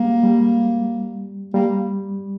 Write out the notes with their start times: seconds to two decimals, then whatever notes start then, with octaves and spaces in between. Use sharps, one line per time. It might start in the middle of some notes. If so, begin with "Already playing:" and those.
Already playing: G3 G#3 A#3
0.23 G3
1.54 G3 A#3